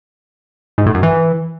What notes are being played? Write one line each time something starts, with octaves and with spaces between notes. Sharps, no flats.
G#2
A2
F#2
E3